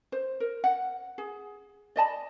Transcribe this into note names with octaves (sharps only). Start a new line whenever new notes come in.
C5
A#4
F#5
G#4
D5 D#5 A5 B5